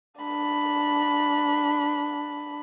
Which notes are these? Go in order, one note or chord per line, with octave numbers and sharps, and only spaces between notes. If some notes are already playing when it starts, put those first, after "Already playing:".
D4 B5